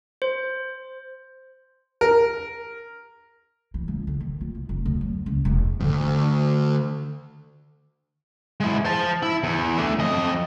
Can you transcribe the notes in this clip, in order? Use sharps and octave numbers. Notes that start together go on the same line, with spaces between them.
C5
A#4
E3
C#2
D3
D#3
F4
C2
F1
D2
F#3
C#2
E1
D2 G2
G#3 E4
C5 A5
E4
E2
A3 D4
F2 D#5